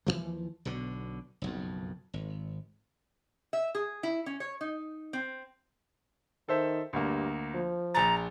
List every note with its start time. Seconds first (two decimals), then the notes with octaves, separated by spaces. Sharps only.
0.07 D#2 C#3 E3 F3
0.65 B1 B2 D3
1.42 F#1 B1 F2
2.13 G#1
3.53 E5
3.75 G#4
4.03 E4
4.26 C#4
4.40 C#5
4.61 D#4
5.13 C4
6.49 D#3 A4 C5 E5
6.93 D2 G2 A#3
7.54 F3
7.95 A#1 A#5 A6